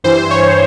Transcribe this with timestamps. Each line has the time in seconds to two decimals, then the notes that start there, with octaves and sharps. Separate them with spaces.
0.04 G2 E3 C5
0.31 C#5